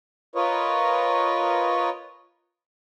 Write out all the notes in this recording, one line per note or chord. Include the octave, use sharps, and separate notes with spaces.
F4 A#4 B4 C#5 D#5